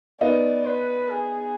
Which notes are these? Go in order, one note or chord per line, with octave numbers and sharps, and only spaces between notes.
B3 D#4 D5
B4
G#4